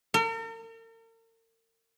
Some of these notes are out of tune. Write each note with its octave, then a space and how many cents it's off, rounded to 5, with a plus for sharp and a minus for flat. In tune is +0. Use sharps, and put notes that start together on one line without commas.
A#4 -45